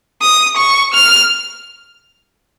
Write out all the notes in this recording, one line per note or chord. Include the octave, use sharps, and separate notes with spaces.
D#6
C#6
F6